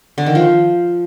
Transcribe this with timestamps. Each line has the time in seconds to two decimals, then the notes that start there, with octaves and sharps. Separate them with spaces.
0.18 D3
0.26 D#3
0.35 F3